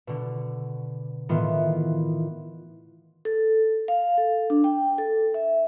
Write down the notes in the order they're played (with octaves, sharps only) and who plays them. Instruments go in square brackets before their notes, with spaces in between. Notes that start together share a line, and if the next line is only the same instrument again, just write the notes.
[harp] B2 D3
A2 D#3 E3 B3 F4
[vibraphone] A4
F5
A4
D4
G5
A4
E5